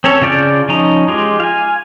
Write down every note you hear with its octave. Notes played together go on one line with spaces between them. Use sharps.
C4 C#4 A4 C#5
C#3 F4 D5 A5 G6
F3 C#4 D#4 A#5
G#3 F4 G4
F5 G#5